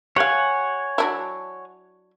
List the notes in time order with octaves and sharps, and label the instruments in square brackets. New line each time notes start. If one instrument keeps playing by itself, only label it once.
[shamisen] G4 F5 [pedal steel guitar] C#5 F#5 G#5
[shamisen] F#3 D4 E4